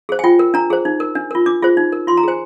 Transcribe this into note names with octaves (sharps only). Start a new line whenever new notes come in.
G#4 C5
G#5
F4 G5
A#4
D4 A#5
G#4 C5
D#4
A#4
D4
F4 A#4
D4 D6
F4 G#4 C5
D#4
A#4
F4 C6
A#5
G#4 C5 G#5